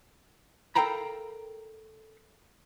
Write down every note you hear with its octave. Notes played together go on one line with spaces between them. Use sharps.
A4 A#4 F5 G5 A#5 B5